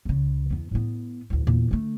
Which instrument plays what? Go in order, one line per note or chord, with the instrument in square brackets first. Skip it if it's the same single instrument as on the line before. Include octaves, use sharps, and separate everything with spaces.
[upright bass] C#2 C#3
E2 B3
A2 B3
A1 D2
E2 A#2
D3 A3